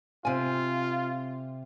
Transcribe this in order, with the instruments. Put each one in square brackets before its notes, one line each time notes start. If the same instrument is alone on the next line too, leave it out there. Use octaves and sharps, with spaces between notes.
[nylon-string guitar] C3 G#5 [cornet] F4